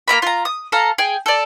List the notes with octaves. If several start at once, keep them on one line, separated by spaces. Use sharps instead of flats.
A#3 E4 A#5 B5
F4 A#5
D#6
A4 F5 A5 A#5
G#4 G5
A4 D5